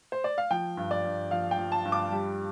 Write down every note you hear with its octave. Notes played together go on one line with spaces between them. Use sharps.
C5
D5
F5
F3 G5
G2
D5
G2
F3 F5
G5
F3
A5
G2
D6
G3